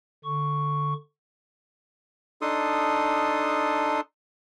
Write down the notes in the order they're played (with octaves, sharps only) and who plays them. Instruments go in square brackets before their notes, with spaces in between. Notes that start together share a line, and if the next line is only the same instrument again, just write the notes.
[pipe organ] D3 C#6
[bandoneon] D4 D#4 A4 C6 D#6